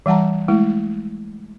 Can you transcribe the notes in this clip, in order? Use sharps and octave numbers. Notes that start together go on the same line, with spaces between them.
E3 G3 F#5 A5 A#5
G#3 A3 E4